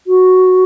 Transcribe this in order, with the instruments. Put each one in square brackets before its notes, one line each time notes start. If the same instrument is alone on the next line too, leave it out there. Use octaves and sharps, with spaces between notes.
[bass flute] F#4